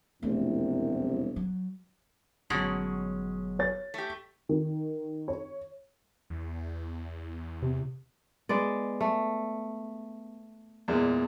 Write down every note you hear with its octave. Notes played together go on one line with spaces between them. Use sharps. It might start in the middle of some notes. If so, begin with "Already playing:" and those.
E1 C2 F2 C3 A3
F#3
G1 B2 F#3 G#3 C#4
C#5 A6
A3 G4
D#3
C#5
E2
C3
G#3 B3 D5
A3
E2 A#2 G#3